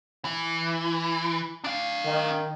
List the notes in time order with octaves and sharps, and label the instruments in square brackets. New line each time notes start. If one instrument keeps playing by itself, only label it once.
[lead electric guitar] E3
D4 F5
[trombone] D#3